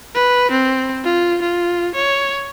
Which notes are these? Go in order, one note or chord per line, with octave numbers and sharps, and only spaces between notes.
B4
C4
F4
F4
C#5